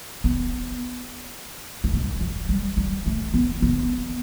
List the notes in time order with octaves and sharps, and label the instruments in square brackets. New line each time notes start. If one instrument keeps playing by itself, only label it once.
[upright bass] B3
A3
G3
F#3
G3
G3
A3
B3
B3